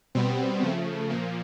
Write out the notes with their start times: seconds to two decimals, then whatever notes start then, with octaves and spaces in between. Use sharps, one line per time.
0.15 B2 G3 B3 C4
0.62 C#3 F3 A3
1.10 A#2 F3 A#3